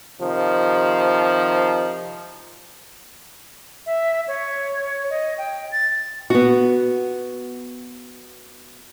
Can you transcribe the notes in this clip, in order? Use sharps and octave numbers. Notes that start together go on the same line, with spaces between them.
C3 D#3 F3
E5
C#5
D#5
G5
A6
B3 F#4